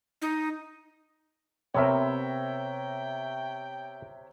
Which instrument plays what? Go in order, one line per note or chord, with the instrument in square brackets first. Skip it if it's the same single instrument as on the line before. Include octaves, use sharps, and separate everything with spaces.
[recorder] D#4
[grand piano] C3 A#5 [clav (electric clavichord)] B3 C4 A#4 [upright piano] C#5 E5 [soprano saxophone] G5